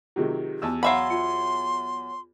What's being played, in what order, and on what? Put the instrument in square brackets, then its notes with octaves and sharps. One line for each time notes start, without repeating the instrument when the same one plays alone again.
[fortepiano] C3 D#3 F#3 [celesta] F4 G4 G#4
[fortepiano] E2 A5 E6
[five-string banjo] F#3 E5 B5 [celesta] F5 C7 [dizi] C6
[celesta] F4 C#7